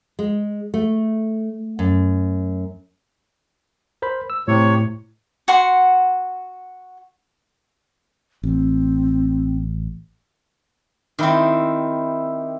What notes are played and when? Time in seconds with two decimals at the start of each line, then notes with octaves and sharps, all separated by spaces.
0.19 G#3
0.74 A3
1.79 F#2
4.02 A#4 C5 B5
4.30 E6
4.48 A2 C3 C#5
5.48 F#4 F#5 C6
8.43 A1 C4
11.19 D#3 C4 E4 G4